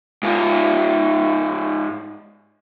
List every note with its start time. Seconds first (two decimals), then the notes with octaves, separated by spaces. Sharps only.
0.23 G#2 F4